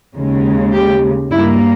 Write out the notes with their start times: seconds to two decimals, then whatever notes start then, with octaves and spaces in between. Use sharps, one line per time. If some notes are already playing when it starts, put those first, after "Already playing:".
0.15 D#2 C#3 G#3
0.73 G4
1.31 G2 G3 A#3 E4